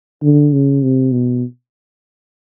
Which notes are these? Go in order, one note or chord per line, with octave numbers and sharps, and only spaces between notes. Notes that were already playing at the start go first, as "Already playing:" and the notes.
D3
C#3
C3
B2